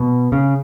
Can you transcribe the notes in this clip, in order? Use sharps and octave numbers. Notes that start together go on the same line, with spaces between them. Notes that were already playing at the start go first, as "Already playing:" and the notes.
Already playing: B2
C#3